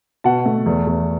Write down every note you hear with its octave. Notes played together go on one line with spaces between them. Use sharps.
B2 F#5 A5
A3
E2
E2